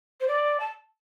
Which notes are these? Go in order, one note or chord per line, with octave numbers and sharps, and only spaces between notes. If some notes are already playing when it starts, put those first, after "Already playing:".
C5
D5
A5